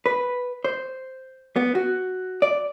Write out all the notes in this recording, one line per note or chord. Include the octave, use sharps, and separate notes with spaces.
B4
C5
B3
F#4
D5